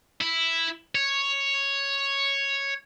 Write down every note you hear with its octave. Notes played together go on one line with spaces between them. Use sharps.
E4
C#5